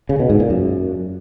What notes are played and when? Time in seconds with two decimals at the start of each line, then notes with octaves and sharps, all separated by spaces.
0.09 C#3
0.19 B2
0.30 G#2
0.40 A#2
0.50 F#2